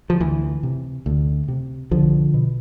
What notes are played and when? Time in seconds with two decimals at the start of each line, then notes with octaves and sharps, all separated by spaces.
0.10 F3
0.20 D2 E3
0.63 C3
1.06 D2
1.48 C3
1.91 B1 D3 F3
2.34 B2